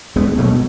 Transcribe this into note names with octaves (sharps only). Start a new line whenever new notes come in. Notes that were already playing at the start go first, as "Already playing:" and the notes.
D2 G#3 B3
B2 F#3 A3